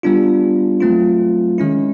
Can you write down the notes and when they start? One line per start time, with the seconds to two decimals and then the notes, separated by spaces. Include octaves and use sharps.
0.03 G3 B3 D4 F4
0.80 F#3 A3 C4 F4
1.58 D#3 G#3 C#4 E4